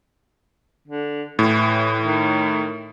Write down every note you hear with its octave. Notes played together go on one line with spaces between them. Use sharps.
D3
A2 E3
D#3